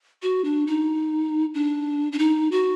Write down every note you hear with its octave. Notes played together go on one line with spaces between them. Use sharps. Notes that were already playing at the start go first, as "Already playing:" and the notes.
F#4
D4
D#4
D4
D4
D#4
F#4